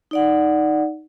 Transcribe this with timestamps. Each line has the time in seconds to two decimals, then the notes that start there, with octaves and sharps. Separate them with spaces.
0.11 D#4 D5 F#5